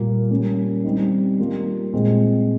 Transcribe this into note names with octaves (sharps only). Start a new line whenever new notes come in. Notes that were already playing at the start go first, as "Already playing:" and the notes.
Already playing: A#2 G3 A#3
G3 A#3 C#4
G3 C4 D#4
G3 A#3 F4
A#2 G#3 C4